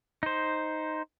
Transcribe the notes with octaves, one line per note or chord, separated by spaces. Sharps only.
D#4 C5